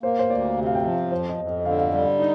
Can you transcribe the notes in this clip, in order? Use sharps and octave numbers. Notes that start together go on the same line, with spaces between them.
A#3 C5
C5
D2 D5
C3
F5
G5
F3
F5
F2 C5
D#5
F2
D#5
D3 F5
F5
G3 F5
F5
D#4